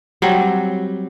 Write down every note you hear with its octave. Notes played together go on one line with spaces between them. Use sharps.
F#3 G3 C4